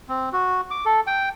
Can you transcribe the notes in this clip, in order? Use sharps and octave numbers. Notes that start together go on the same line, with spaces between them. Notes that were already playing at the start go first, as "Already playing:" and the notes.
C4
F#4
D6
A4
G5